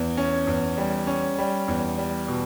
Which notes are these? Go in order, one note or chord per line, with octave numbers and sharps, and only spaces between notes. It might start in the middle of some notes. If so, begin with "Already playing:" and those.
Already playing: E2
C#4
E2
G3
C#4
G3
E2
G3
B2